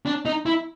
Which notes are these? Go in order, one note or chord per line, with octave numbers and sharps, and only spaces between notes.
D4
D#4
E4